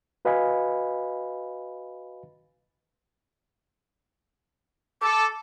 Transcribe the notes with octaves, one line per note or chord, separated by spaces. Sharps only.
F#4 B4 D#5 F5 G#5 B5
A4 D6